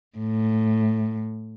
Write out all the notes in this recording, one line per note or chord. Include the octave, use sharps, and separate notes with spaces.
A2